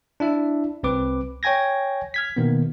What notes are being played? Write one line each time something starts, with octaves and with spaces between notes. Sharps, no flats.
D4 E4 E5
C2 C4 B4 D6
C#5 G5 G#5 G#6 A#6
F6 G#6 B6
B2 D#3 A#3 B3